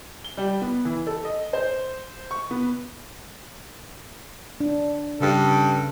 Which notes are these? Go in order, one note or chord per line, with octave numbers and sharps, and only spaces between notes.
G7
G3
B3
E3
A4
D#5
C5
C#6
B3
D4
G2 C#3 A4